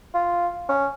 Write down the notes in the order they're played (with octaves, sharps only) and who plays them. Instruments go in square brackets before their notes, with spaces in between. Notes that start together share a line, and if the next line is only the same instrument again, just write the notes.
[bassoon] F4
C#4